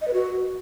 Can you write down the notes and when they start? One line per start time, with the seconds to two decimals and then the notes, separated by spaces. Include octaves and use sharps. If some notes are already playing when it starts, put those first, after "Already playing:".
0.01 D#5
0.08 B4
0.14 F#4